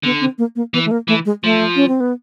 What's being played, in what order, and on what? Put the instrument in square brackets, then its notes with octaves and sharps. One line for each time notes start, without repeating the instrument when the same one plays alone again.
[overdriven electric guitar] D3 [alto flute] B3
[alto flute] C4
A#3
A#3
[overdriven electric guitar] E3 [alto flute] B3
[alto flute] A3
A#3
[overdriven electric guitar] E3 [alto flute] A3
[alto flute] G#3
[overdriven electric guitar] F3 [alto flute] A3
[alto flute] C#4
C4
B3